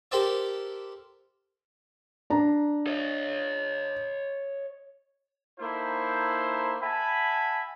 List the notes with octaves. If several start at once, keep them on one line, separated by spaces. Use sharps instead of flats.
G4 A4 A#4 C5 D5 E5
D4 A#5
C#5 D#5
A#3 D#4 E4 A4 C5
E5 F#5 G#5 A5 B5